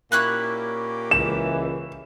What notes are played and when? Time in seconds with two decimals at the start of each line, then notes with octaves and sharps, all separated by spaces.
0.12 A#2 A#3 C#4 E4 G4 F#6
1.11 C#2 E3 E7